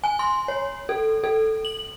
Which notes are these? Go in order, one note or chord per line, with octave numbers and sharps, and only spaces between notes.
G#5
C6
C#5
A4
A4
F#7